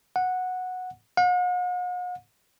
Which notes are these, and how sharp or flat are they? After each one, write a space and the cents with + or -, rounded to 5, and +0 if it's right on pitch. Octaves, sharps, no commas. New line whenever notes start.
F#5 -10
F#5 -45